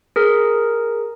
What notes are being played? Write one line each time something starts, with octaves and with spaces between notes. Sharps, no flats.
G#4 A#4